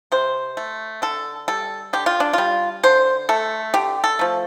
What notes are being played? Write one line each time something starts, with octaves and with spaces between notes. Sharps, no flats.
C3 C5
A3
D3 A4
G3 A4
D3 G4
F4
D4
G3 F4
D3 C5
A3 A4
D3 G4
A4
F3 A3